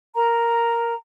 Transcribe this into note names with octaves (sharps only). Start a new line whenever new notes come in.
A#4 A#5